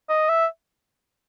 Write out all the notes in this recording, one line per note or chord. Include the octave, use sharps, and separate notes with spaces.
D#5
E5